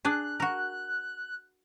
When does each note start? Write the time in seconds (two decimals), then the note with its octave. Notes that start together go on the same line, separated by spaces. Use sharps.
0.05 D4 G#4 F#6
0.40 F#4 A#4